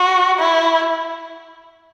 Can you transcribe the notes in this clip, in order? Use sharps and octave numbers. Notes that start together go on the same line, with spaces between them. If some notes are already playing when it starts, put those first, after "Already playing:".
Already playing: F#4
E4